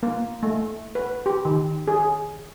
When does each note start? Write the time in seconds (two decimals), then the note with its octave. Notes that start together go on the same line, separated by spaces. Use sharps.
0.03 A#3
0.43 A3
0.95 B4
1.26 G4
1.45 D#3
1.88 G#4